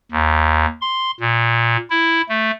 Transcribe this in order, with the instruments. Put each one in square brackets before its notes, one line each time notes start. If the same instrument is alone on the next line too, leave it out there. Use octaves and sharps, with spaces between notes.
[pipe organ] D#2
C6
A#2
E4
A3